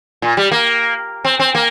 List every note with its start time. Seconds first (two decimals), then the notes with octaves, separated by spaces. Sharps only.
0.22 A#2
0.37 G3
0.52 A#3
1.25 C4
1.39 C4
1.55 A#3